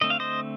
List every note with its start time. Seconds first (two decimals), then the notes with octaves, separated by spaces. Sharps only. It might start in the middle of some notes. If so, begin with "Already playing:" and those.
0.01 D3 A3 C4 D#5
0.10 F5
0.20 C5 D#5